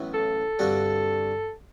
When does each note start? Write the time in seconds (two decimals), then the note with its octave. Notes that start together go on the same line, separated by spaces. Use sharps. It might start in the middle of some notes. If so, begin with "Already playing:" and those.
Already playing: A1 A2 F#3 B3 F#4
0.14 A4
0.59 G2 D3 G3 C4 F#4